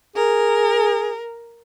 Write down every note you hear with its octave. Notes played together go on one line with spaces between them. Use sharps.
G#4 A#4